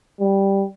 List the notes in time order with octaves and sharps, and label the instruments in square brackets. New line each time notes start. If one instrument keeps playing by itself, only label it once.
[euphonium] G3